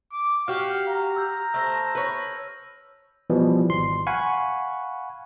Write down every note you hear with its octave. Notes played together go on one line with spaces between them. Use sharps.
D6
F#4 G4 F5 F6
A#5
E6 G6
A3 C5 E6 A#6
B4 C#5
B2 E3 F3 G3
G#1 C6
F5 F#5 G#5 B5 C#6